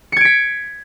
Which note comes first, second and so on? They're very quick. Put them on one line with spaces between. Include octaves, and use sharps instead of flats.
C#7 G#6 D7 B6